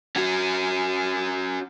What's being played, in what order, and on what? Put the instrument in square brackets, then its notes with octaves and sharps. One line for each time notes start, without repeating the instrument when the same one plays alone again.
[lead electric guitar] C#4 F#4